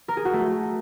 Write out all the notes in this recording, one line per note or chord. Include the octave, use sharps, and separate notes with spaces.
A#4
G#4
F#4
A3